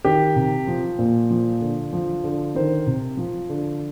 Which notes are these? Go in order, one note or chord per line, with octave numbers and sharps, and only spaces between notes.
D#3 G4
C3
F3
A#2
F3
D3
F3
D3
D#3 C5
C3
F3
D3